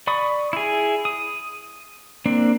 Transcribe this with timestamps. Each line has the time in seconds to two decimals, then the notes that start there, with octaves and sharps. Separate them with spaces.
0.07 D5 B5 C#6 D#6
0.53 E4 G#4
1.05 D#6
2.26 A#3 C4 D4